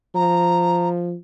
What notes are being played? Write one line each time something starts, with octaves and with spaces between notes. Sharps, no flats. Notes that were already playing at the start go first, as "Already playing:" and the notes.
F3 A#5